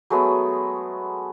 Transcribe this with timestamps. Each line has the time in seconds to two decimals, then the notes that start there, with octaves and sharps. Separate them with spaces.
0.10 F#3 G#3 A3 B3